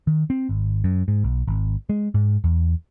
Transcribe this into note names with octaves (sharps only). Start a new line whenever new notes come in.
D#3
C4
G#1
F#2
G#2
B1
G#1
G#3
G#2
E2